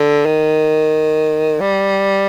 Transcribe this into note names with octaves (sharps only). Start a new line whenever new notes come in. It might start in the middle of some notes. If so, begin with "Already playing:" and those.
Already playing: D3
D#3
G3